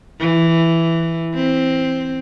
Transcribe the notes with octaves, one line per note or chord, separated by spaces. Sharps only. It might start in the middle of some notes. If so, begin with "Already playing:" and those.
E3
C4